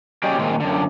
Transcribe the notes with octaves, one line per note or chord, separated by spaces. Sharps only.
F#3 C#4 G4 G#4 D5 D#5
A#2 D#3 G#3 C4
F#2 D3